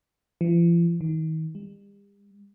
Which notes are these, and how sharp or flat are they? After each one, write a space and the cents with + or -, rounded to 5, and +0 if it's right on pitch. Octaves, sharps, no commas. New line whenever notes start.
F3 -45
D#3 +35
G3 +45